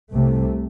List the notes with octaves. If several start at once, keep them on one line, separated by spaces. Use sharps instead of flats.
C2 C3 A3